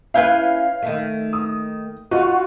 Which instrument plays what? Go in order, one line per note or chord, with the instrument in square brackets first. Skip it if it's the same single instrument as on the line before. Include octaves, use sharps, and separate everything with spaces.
[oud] C#4 E4 B4 [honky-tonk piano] F5 G6 G#6
[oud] D#3 A3
[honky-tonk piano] D#6
[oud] D#4 [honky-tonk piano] F4 F#4